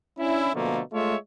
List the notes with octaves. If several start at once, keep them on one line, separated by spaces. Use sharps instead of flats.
C#4 D4 E4
B2 D3 F3 A3 A#3
G#3 A3 F4 C#5 E5